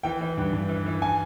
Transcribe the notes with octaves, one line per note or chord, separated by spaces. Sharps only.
E3 G5
E3
G2
G2
E3
E3
G#5